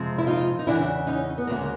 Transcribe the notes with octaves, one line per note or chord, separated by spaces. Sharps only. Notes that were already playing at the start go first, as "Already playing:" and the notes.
Already playing: F2 C3 F3 G#3
E4
D#4 F4
D#4
E2 C#3 E3 D4 E4
C#4 D#4
B3
D2 C#3 F#3 G#3 A#3